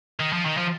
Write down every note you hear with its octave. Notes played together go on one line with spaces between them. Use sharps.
D#3
F3
D#3
F3